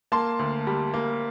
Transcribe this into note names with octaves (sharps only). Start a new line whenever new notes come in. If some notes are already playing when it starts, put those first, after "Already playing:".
A#3 A5 C6
D2
G3
A#3